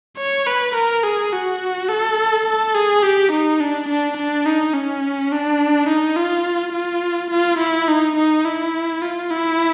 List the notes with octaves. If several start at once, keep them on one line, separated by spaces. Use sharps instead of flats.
C#5
B4
A#4
G#4
F#4
A4
A4
G#4
G4
D#4
D4
D4
D4
D#4
C#4
D4
D#4
F4
F4
F4
E4
D#4
D#4
E4
F4
E4